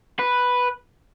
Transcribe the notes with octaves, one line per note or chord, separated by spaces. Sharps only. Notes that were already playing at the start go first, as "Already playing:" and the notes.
B4